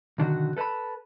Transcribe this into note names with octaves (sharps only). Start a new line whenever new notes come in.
B1 D3 D#3 F#4
A4 B4 C5 A5 B5